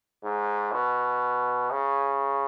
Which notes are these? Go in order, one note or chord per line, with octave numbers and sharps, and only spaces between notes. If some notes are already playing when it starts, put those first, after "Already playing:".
G#2
B2
C#3